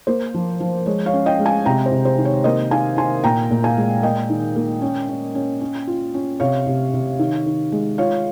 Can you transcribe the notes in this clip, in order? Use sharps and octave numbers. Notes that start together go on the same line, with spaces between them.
A#3 C5
F3
F3
G#3 C#5
C#5 F5
C#4
D#5 G5
G#3
F5 G#5
C3 G5 A#5
C5
C3
C5
D#3
C#5
A#3 C5 D#5
D#3 F5 G#5
D#3 G#5 C6
A#2 G5 A#5
A#2
F5 G#5
G#3
A#3 D#5 G5
D#3
A#3
C#4
C#4
C#4
C#4
F4
C#4
C3 C#5 F5
C3
C3
D#3
D#3
G#3
F4 C#5 F5